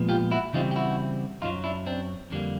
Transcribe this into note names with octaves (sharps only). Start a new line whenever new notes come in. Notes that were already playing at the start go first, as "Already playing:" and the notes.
Already playing: A#2 F3 G#3 B3
F4 G4
E4 F#4
C#3 E3 G3 C4 D#4 F4
G4
E4 F#4
F#2 D#3 F#3 D#4 F4
D4 E4
C4 D4
F2 D3 G3 A#3